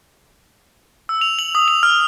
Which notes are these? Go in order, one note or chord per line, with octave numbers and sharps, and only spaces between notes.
E6
F7
F#7
D#6
F7
F6